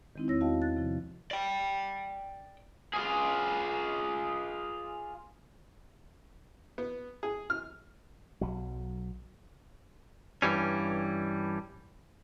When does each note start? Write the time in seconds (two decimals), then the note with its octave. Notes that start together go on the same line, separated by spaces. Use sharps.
0.16 D#3 G#3 C4 D#4 E4
0.28 E2 E4 C#5 E6 A#6
0.41 B3 F#4 D#5 F5 G5 A5
0.61 F#6 A6
0.77 C3 F3
1.31 D5 G5
2.93 F4 G#4
6.78 B3
7.23 G#4
7.50 F6
8.41 B1 F#3
10.42 G2 E3 G3 C#4